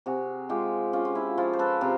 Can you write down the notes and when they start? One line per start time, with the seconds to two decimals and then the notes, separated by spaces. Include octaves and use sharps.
0.06 C3 F#4 G#4
0.49 G#3 F4 G4
0.93 C#4 F4
1.05 F4
1.15 E4
1.38 F3 F4
1.53 C5
1.59 A4 B4
1.81 C3 A#4 C5